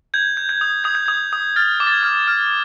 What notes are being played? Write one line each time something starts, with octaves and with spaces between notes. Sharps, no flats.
G6 G#6
G6
G6
D#6
D#6 G#6
G6
D#6 G#6
D#6
F6 A6
D6
A6
G#6
F6
F6